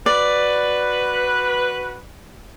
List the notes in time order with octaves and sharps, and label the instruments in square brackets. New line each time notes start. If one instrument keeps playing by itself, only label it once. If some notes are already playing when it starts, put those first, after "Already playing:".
[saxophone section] F#4 B4 [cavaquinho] D5